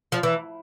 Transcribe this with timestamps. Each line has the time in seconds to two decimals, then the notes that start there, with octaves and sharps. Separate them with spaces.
0.12 F3
0.23 E3